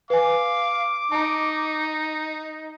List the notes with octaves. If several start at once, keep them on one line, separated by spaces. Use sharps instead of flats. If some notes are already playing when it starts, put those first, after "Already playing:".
B4 F5 G#5 D6
D#4 A5 A#5